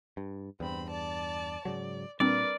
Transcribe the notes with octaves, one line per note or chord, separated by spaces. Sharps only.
G2
E2 G2 C4 B5
D5 A5
G#2 C#3 F#3 D5
A#2 G3 C4 D4 A#4 B4 D5